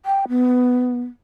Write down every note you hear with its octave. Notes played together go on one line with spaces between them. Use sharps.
G5
B3